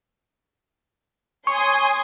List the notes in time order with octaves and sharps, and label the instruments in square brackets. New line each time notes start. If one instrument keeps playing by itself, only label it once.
[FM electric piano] C#5 [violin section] G#5 C6 D#6